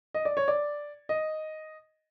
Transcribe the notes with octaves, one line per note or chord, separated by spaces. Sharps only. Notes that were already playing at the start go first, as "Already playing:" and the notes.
D#5
D5
C#5
D5
D#5